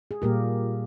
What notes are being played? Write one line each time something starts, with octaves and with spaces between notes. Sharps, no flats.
G#4
A#2 G3 A#3 G4 A#4